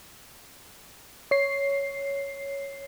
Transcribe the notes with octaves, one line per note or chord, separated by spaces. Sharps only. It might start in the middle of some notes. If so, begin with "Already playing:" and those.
C#5 C7